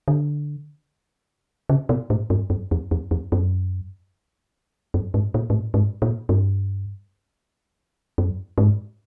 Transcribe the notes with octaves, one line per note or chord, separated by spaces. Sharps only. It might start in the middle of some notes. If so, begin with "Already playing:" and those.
D3
C#3
B2
A2
G2
F#2
F2
F2
F2
F#2
F#2
G#2
A#2
G#2
A2
G#2
A#2
G2
F#2
G#2